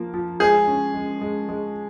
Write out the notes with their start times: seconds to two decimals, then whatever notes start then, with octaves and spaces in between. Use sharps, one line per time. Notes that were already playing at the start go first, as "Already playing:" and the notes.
Already playing: F3 A#3
0.14 F3
0.40 G#3 G#4
0.67 C#4
0.94 G#3
1.21 G#3
1.49 G#3